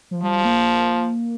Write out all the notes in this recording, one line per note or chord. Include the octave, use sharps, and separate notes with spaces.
F3
F3 G3
A#3